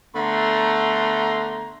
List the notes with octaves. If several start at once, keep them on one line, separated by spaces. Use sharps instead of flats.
D3 A3 B3 A#5 C6